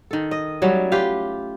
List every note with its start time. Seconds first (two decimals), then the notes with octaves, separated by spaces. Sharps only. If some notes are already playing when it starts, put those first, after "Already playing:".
0.11 D#3 A4
0.31 D#5
0.62 F#3 G3 A3 C#4
0.92 F4 G4 B4 F5